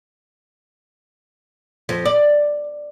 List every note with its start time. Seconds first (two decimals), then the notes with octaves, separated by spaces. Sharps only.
1.89 F2
2.05 D5